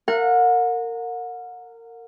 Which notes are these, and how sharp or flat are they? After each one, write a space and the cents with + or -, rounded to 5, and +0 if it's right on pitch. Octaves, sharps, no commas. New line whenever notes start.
A#4 -25 F#5 -35